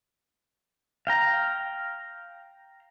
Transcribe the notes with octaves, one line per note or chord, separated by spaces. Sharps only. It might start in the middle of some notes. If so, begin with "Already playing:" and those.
F5 G5 A#5